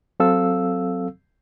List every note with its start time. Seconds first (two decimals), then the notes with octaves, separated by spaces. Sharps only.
0.20 F#3 C4 A4 F5 E6